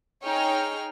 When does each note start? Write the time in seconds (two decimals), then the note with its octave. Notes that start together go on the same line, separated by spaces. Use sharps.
0.24 D#4 G#4 C#5 G5 F6